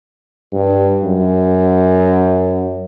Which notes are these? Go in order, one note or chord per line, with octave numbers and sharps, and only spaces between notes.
G2
F#2